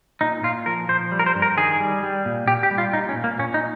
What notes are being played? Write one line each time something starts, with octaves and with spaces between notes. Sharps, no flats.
A#2 D#4
A#2 F4
F3 A#4
F3 C5
G3
A#4
C5
G2
A#4
D#3 G#4
G3
G3
A#2
A#2 G4
G4
G3
F4
A#2 D#4
C#4
A#2
A#3
A#2 C#4
D#4